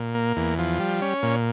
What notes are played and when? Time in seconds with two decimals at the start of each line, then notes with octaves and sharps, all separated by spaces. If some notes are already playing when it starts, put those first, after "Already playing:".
Already playing: A#2
0.15 A#3
0.37 E2
0.59 F3
0.80 G3
1.02 C#4
1.23 A#2